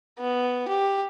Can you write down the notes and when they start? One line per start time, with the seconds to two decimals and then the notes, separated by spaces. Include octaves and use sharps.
0.20 B3
0.68 G4